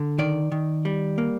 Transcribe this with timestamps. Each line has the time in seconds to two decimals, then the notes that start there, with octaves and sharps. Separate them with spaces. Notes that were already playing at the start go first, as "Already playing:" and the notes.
Already playing: D3
0.18 D#3 D5
0.52 D#3
0.85 G3
1.18 A#3